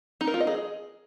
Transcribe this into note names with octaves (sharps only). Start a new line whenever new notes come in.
D#4
A#4
F4
D#5
G#4